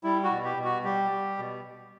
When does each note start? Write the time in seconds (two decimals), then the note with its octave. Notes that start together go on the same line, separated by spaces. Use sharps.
0.04 G3 E4
0.24 F#4
0.31 B2
0.44 G4
0.57 B2
0.64 F#4
0.84 G3 G4
1.11 G3
1.38 B2